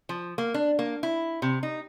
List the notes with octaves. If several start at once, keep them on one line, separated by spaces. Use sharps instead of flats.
F3
A#3
D4
A#3
E4
C3
D#4